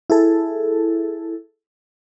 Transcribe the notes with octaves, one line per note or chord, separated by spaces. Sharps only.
E4 G#4 A4